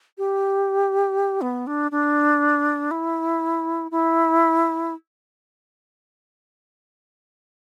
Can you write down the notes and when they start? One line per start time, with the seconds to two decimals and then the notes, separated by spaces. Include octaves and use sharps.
0.18 G4
1.41 B3
1.67 D4
1.91 D4
2.91 E4
3.91 E4